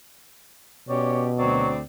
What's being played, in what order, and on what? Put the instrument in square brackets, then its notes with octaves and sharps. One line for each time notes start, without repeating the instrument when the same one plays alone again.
[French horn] B2 [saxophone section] C#4 G4 D5 [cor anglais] C#5
[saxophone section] D2 C4 D5 [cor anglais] F#3